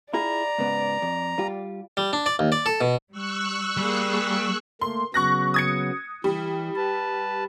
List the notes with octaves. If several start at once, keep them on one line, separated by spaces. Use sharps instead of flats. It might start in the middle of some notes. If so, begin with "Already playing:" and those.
E4 F4 G#4 D5 A#5
G#2 C#3 B3
F2
G3 F4 G4
G3
D4
D5
D#2
D5
A4
B2
G3 C#6 E6 F#6
G3 A#3 G#4
A3 A#3 C6
C#3 F#3 B3 C#6 F#6 A#6
D#6 G#6 C#7
E3 G3
B4 A5